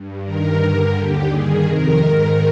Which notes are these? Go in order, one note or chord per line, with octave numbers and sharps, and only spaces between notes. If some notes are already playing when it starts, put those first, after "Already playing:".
Already playing: G2
G2 D#3 A#4
G2 D3
D#2 D3 G4
G2 D#3 G#4
F2 C3 D#3 A#4
G#2 D#3 A#4